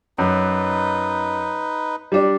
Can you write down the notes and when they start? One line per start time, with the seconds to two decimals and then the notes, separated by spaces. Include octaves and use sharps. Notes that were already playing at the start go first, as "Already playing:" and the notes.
0.18 F#2 D#4 B4
2.12 G3 D4